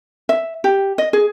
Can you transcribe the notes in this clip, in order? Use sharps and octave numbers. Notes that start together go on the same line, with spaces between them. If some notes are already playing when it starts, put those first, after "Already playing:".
E5
G4
D#5
G#4